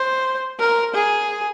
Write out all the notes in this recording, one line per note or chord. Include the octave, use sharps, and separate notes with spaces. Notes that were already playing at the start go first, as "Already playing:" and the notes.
Already playing: C5
A#4
G#4